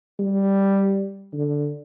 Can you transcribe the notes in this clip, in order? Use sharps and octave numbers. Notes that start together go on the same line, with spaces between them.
G3
D3